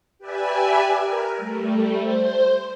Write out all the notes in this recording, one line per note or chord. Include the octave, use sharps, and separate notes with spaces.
G4 B4 D5 E5 G#5
A#4
G3 A3
C5